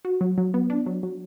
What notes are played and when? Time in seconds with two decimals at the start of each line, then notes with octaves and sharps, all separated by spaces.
0.05 F#4
0.21 F#3
0.38 F#3
0.54 B3
0.70 D4
0.86 F#3
1.03 F#3